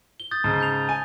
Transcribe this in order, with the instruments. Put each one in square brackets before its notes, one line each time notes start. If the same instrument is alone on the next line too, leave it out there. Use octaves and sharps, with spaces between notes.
[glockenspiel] G7
D#6 G6 A6
[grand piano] G#2 C#3 [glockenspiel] A5
[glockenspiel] A5 G6 F7
[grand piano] G#5 [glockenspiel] D#7